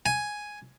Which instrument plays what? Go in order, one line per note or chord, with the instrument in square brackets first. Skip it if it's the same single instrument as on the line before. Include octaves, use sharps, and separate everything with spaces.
[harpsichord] G#5